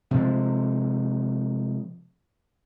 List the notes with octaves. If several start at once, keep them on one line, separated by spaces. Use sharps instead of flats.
C3 F3 G#3